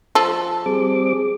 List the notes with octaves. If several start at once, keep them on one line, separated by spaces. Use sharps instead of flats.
F3 A4
G3 C4 G#4 D6